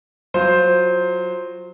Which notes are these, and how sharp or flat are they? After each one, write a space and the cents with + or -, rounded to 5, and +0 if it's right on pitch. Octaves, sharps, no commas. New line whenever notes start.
F#3 -15 F4 +0 C5 +0